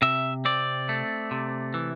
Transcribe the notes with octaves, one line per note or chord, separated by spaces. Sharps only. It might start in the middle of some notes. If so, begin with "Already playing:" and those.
C3 E5
C4 D5
A3
C3
E3